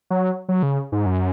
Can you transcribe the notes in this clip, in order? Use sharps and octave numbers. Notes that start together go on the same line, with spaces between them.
F#3
F#3
C#3
G#2
F#2